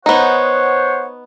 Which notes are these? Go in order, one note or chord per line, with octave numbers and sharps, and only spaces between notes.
B3 D#4 C5 C#5 F#5